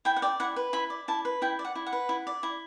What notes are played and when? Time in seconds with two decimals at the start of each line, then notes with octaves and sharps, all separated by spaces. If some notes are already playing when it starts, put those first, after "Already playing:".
0.05 E4 G5
0.16 F#5
0.22 D5 G5
0.40 E4 F#5
0.56 B4
0.73 E4 B5
0.90 D5
1.08 E4 A5
1.25 B4
1.42 E4 G5
1.59 D5
1.65 F#5
1.75 E4
1.86 F#5
1.93 B4
2.09 E4
2.27 D5
2.43 E4